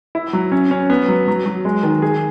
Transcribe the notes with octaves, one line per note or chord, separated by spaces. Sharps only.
E4
F#3
C#4
C#4
B3
F#3
F#3
F#3
G#3
D#3
G#4